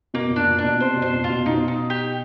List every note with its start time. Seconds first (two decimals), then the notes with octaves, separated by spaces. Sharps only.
0.14 B2 A#3
0.30 A#2
0.36 D4
0.47 A#2
0.59 D4
0.64 B2
0.80 C3 C5
0.97 B2
1.02 C5
1.14 A#2
1.24 F4
1.30 B2
1.46 B2 D#4
1.68 D#4
1.90 G4